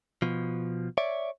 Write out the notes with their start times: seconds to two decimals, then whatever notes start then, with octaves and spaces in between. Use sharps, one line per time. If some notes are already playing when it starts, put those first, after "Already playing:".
0.22 B2 F3
0.98 C#5 D5 E5